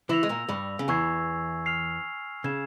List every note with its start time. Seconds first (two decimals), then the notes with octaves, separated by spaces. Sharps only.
0.09 E3 E4 E6 A#6 F7
0.23 G#3
0.29 A#2 A#3
0.49 G2 G3
0.79 C#3
0.88 E2 E3 G#5 C#6 E6 G#6 C7
1.66 F6 C7 F7
2.44 C#3 E6 G#6 E7